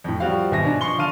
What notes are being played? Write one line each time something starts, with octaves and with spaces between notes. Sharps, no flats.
F2 A2
F3 G3 C4 F#4 F5
G#1 B2 E5 G#5 A#6
G2 D4 D#4
F3 C6 C#6 G7
D3 D4 F5 A5 F6 D#7